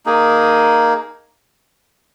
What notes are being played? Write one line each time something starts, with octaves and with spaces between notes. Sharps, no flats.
A#3 D#4 G#4